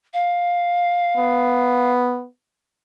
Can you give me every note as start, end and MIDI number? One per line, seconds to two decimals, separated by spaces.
0.13 1.91 77
1.17 2.26 59